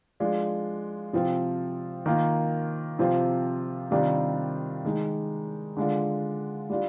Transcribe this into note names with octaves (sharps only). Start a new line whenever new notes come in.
F3 G#3 D4 F4
C3 F3 C4 F4
D#3 A#3 F4
C3 F3 C4 F4
C3 D#3 G3 D4 F4
D#3 G#3 D#4
D3 G#3 D4 F4
G3 D4 F4